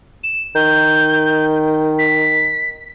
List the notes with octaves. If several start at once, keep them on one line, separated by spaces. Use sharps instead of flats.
E7
D#3 G6
B6